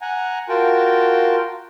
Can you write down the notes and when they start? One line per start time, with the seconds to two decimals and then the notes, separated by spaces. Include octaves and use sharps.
0.01 F#5 G#5 A#5
0.49 F4 F#4 A#4 G5 A5